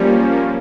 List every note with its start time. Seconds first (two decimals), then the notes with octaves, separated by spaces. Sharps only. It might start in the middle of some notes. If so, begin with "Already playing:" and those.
Already playing: F3 G3 A#3 C#4